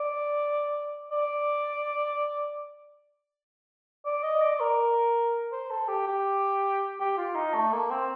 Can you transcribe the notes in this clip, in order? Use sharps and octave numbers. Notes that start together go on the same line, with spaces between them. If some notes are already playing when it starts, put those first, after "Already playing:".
Already playing: D5
D5
D5
D#5
D5
A#4
C5
A4
G4
G4
G4
F4
D#4
A3
A#3
C4